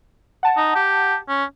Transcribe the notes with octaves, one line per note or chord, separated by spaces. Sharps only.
F#5 A5
D#4
G4
C#4